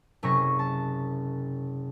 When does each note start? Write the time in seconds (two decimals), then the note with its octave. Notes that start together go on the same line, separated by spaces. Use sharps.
0.23 F#1 C3 C#4 C#6 A#6
0.59 A5